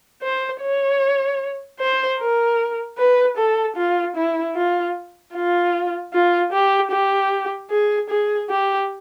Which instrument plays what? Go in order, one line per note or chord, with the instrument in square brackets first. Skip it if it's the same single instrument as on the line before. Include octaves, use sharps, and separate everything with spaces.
[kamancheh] C5
C#5
C5
A#4
B4
A4
F4
E4
F4
F4
F4
G4
G4
G#4
G#4
G4